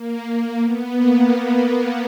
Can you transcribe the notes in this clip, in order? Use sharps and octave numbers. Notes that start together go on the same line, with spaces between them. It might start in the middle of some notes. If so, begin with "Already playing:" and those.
Already playing: A#3
A#3
B3
A#3